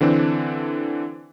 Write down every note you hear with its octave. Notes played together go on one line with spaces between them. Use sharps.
D3 E3 C4 D4